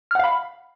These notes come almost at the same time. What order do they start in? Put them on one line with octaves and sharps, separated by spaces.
F6 F#5 F5 B5